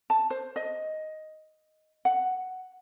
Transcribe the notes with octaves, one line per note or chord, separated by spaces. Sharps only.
A5
C5
D#5
F#5